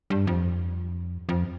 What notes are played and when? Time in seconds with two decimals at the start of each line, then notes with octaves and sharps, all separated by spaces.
0.10 G2
0.27 F2
1.29 F2